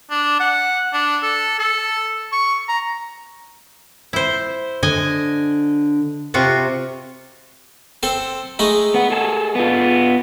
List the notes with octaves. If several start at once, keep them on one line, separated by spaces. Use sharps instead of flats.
D4
F#5
D4
A4
A4
C#6
A#5
E4 C5
D3 D#5 G#5
C3 F4 F#4
C4 A4 C5
G#3 A3 D#4
B3 F#5
G#4 A4
B3 F4